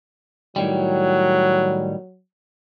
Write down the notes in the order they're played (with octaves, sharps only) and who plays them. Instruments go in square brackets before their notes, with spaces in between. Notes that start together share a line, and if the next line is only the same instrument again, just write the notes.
[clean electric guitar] A2 D#3 G3 [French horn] F#3